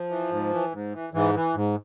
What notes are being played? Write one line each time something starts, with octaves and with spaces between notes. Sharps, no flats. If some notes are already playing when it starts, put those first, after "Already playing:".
Already playing: F3
E3
G#2
E3
G#2
E3
G#2 E3
E3
G#2